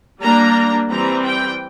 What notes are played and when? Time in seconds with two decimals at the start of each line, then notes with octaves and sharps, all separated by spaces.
0.21 G3 A#3 D4 A#5
0.89 E3 G3 C4 A#5
1.25 G5